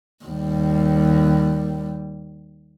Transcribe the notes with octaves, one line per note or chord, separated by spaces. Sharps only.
D#2 G3